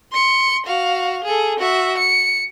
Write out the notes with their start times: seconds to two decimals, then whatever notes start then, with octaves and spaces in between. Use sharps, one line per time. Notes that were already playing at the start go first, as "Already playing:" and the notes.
0.13 C6 C#7
0.66 F#4 F5
1.24 G#4 A4
1.59 F#4 E5
1.98 C#7